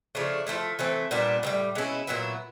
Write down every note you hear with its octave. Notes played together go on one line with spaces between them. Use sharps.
C#3 F3 A3 D4
F3 A3 C4 E4
E3 A3 C4
A#2 G3 B3 D4
A2 E3 G3
B2 G#3 C#4 E4
A#2 F#3 B3 E4